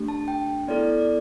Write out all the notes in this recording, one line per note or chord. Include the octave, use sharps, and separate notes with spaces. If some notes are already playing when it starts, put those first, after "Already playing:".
Already playing: A3 D4 G4
A5
G5
B3 E4 A4 D5
D5
D5